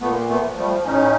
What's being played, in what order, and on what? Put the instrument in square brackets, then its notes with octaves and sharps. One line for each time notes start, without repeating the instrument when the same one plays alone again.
[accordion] A#2 A3 B3
A3 B3
F3
G3 A3
A2 C#4 D#4